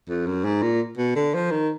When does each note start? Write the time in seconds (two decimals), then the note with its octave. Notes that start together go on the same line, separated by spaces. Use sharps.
0.09 F2
0.26 F#2
0.44 G#2
0.62 A#2
0.98 B2
1.15 D3
1.34 F3
1.51 D#3